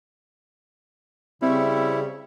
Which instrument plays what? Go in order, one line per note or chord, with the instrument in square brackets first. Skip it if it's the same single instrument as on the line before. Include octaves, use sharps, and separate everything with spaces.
[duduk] C#3 [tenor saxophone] G3 [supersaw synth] C4 E5 C#6 [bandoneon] E4